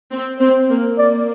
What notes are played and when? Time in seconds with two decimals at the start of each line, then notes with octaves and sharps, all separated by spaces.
0.12 C4
0.40 C4 C5
0.69 A#3
0.98 A#3 D5